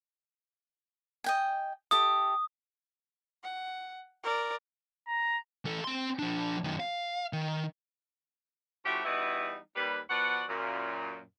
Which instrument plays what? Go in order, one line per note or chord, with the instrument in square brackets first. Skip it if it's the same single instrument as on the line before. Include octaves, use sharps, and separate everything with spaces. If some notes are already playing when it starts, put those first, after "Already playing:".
[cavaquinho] D#5 G5 G#5
[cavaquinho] G4 A4 E5 [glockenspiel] D#6
[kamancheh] F#5
A#4 D5
[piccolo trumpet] A#5
[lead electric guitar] E3 A4
C4 C6
F3 D4
F#2 D#3
F5
D#3
[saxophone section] F3 A3 C#4 E4 F#4 G4
E3 G3 B3 D#4 E4 F#4
D#2 G3 B4
F3 B3 F#4 D5 F#5
F#2 A#2